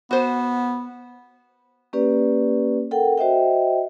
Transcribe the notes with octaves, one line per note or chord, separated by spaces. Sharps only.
B3 F#4 C5
A#3 C#4 G4 B4 D5
A4 A#4 F#5 G5
F#4 C5 D#5 E5 G5